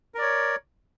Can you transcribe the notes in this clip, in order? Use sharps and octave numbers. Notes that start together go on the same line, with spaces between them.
A#4 C#5 D5